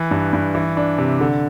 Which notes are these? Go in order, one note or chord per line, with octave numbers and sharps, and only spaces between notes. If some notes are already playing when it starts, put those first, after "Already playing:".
Already playing: E3
G2
G2
E3
D4
C3
D3